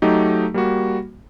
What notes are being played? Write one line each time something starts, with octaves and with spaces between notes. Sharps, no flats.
F#3 A3 D#4 G4
G3 A#3 F#4